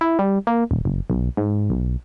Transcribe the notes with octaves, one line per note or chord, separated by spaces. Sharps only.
E4
G3
A#3
D#1
F#1
B1
G#2
B1